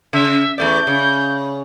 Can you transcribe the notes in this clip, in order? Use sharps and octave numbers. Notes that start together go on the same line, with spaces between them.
C#3 E5
E2 A3 D5 G6
C#3